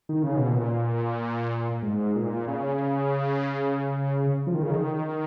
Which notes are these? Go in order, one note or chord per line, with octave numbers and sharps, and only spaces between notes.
D#3
C#3
B2
A#2
G#2
A#2
C#3
F3
D#3
C#3
D#3